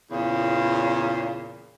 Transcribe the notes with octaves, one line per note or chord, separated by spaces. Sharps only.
E2 A#2 C#3